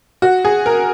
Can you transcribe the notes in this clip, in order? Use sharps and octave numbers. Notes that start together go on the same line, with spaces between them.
F#4
G#4
A#4